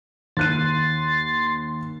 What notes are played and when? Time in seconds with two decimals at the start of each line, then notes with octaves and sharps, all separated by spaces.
0.37 D#2 C6 F#6 A6 D#7